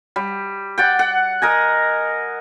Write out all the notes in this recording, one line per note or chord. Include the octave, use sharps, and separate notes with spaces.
G3
D5 F#5 G5
F#5
A#4 D#5 G#5